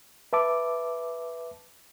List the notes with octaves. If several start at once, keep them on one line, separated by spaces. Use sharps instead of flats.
B4 E5 A5 D6